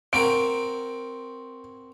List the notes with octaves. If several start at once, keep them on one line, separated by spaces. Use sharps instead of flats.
C4 F#4 A#4 D7